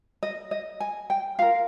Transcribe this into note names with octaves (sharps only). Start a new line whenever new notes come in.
D#5
D#5
G#5
G5
F4 A#4 F5